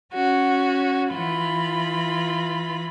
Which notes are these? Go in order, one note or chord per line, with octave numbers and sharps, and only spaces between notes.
C#4 F#4
E3 F4 B5